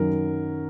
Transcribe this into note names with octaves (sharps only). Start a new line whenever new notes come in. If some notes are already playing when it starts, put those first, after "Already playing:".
Already playing: F#2 D#3 F#3 A#4